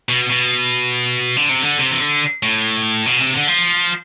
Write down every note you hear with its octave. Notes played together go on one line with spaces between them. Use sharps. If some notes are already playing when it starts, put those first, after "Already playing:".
B2
B2
D3
C3
D3
C3
E3
D3
A2
B2
C3
D3
F3